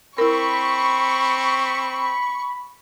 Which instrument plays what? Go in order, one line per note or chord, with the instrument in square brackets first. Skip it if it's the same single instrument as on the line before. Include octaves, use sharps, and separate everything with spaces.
[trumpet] C4 [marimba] E4 A#4 [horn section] B5 [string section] C#6